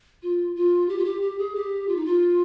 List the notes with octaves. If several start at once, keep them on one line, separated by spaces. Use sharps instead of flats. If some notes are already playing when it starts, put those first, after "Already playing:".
F4
F4
G4
F4
G4
G4
G#4
G4
F4
D#4
F4